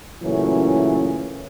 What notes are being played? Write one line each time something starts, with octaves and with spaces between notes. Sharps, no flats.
A#2 C#3 E3 F#3 A3 C#4